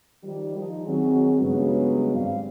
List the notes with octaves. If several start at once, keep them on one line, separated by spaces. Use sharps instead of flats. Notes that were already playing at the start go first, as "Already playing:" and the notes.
D#3 F3 G3
F3 D#4
D#3 F#3 C4 F#4 G#4
G2 C#3 F#3 G#3 B3
G#1 G3 C4 F5